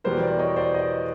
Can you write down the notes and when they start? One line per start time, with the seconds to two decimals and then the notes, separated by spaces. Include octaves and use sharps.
0.04 E2 B2 G3 B3 A#4 C5
0.22 C5 D5
0.39 C#5 D#5
0.56 C5 D5
0.74 C#5 D#5